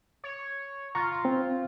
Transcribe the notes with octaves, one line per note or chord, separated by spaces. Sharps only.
C#5
F4 A#5 C#6
C4